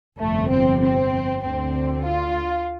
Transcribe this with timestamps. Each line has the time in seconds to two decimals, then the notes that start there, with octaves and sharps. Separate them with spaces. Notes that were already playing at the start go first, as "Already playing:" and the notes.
0.19 G1 F2 C3 A3
0.50 C4
0.80 C4
1.41 D2 D3 C4
2.03 F4